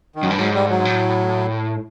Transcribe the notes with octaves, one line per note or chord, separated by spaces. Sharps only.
D#3
F#2
G2
G#2 F#3
G3
F#3
A2